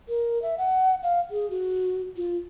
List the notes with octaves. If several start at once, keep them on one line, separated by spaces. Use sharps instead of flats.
A#4
E5
F#5
F5
G#4
F#4
F4